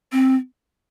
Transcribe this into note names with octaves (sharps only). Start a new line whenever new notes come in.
C4